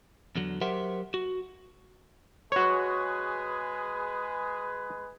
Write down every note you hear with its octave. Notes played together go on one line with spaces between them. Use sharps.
E2 D3 F#3
F#3 G4 A#4 C5 E5 F#5
F#4
G#3 F#4 G#4 B4 C#5